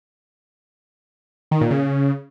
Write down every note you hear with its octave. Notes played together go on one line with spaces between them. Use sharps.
D#3
A#2
C#3